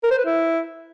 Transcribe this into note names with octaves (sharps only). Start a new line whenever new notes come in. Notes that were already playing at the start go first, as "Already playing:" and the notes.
A#4
C5
B4
E4